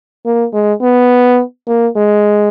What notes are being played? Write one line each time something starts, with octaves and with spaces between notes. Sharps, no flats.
A#3
G#3
B3
A#3
G#3